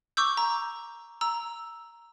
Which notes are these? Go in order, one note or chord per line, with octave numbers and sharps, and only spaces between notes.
C#6 D6 E6 G6
A#5
A#5 E6